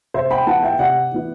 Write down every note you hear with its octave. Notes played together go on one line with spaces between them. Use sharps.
C3 C5 E5
G5 B5
E3 B3 E4 F#5 A5
E5 G5
C3 D5 F#5
E3 B3 E4